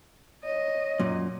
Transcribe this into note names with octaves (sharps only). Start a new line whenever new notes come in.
C#5 D#5
F#2 A#2